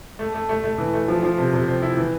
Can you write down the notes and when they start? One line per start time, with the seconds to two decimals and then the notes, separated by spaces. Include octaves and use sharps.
0.19 A3
0.34 A3
0.49 A3
0.64 A3
0.78 E3
0.94 A3
1.08 F3
1.23 F3
1.38 C3
1.53 C3
1.67 C4
1.82 E4
1.97 E3